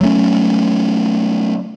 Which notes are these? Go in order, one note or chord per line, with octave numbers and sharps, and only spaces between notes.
F#3 A3 C#4